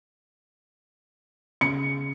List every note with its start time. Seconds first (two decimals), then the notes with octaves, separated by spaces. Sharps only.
1.61 C#3 C#7